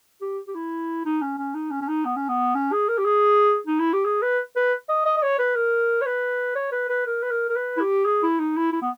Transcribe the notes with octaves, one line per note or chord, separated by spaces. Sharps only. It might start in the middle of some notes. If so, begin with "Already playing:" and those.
G4
G4
E4
D#4
C#4
C#4
D#4
C#4
C#4
D#4
B3
C#4
B3
C#4
G#4
A#4
G4
G#4
D#4
E4
G4
G#4
B4
B4
D#5
D#5
D#5
C#5
B4
A#4
C#5
B4
C#5
B4
B4
A#4
B4
A#4
A#4
B4
E4
G4
G#4
E4
D#4
E4
E4
B3